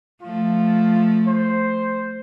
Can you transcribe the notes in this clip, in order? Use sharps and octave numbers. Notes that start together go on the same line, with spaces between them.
F3 A3 F4
C5